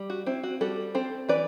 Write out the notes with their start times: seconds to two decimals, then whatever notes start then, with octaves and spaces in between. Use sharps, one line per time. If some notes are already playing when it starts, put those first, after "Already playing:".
Already playing: G3
0.10 F#4
0.26 C4 E4
0.43 F#4
0.61 G3 F#4 A4
0.95 C4 A4 C5
1.29 E3 B4 D5